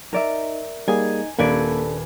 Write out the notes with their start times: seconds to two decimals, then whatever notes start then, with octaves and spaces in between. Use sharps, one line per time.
0.13 D#4 A#4 D5 E5
0.88 G3 A#3 D#4 G#4 G#5
1.38 D#1 A#3 D4 A4 B4 D5 G#5